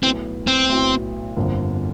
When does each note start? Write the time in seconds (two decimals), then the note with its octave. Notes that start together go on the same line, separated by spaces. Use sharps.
0.03 B1 A2 F#3 B3 C4 E4
0.47 C4
0.69 B1 A2 F#3 B3 E4
1.36 G1 F2 D3 F3 A#3